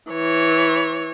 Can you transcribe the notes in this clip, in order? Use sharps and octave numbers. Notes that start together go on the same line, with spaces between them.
E3 C#5